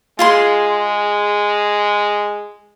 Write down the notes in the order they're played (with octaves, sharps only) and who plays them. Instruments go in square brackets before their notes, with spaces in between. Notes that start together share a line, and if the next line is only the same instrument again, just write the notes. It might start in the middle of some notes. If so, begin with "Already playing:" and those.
[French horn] G#3 [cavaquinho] F4 G#4 C6